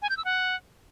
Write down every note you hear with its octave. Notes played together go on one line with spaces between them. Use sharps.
G#5
G6
E6
F#5